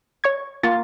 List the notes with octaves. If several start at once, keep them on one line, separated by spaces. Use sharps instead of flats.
C#5 C#6 G#6
A#3 F4 A6